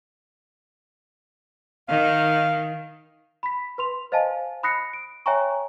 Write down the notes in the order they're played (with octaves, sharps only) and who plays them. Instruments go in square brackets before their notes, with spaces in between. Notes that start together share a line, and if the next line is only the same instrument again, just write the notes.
[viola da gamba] D#3 [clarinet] F5
[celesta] B5 B6
B4 C6 F7
C5 D#5 F5 G#5 A5
B5 D#6 F#6 A#6 C7 C#7
D7
C#5 E5 G5 G#5 A#5 C#6